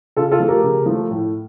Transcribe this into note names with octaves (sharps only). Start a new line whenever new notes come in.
C#3 F4 A4
F4 A4
F3 A3
G4 A#4
C#3
F3 A3
A2